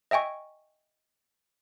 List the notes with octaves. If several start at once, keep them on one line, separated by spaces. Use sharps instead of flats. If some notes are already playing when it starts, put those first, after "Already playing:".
D#5 E5 G5 G#5 C#6